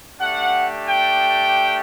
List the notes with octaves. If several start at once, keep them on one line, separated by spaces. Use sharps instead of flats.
A3 D4 G4 F#5
G5